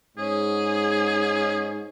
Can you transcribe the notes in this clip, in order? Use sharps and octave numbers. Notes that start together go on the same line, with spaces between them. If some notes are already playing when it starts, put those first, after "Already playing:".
G#2 C#4 G#4